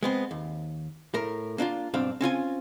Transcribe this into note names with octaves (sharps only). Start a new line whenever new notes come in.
G#3 B3 C4
D#2
A2 A#4
A#3 D4 D#4 F4
B1 G2 C4 D4 F5
C4 C#4 F4 G#5